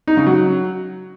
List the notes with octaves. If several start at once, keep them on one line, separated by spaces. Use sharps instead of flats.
D#4
C#3
F#3